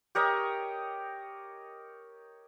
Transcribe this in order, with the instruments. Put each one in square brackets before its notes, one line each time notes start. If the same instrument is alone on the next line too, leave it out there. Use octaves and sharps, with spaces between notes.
[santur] G4 A#4 C#5 D#5